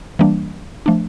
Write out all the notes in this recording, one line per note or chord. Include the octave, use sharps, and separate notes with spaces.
E3 G3 A#3 D4
F3 A3 D4